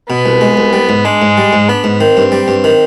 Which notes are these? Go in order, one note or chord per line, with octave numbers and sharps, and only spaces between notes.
B2 B3
C2
G#3
C2
G3
G#2
G#3 D4
G#2
G3
G#2
B3 D4
G#2
D#3 C4
G2
G3
G2
D#3